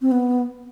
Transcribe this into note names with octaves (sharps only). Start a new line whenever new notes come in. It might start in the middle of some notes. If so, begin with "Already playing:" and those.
C4
B3